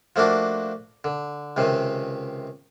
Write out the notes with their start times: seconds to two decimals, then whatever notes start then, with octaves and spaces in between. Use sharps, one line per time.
0.16 F3 A3 A#3 D4 F#4
1.04 D3
1.57 C#2 C3 D#3